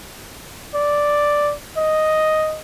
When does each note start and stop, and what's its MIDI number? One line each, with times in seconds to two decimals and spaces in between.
0.75 1.54 74
1.77 2.61 75